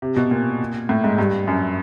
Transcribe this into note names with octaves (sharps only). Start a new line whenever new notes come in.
C3
B2
A#2
A2
G#2
G2
F#2